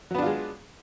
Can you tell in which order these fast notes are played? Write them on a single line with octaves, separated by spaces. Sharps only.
F#3 B3 D4 F4 G#3